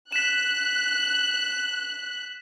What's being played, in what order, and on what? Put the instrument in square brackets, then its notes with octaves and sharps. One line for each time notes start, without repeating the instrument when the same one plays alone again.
[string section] F#6 [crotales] B6 E7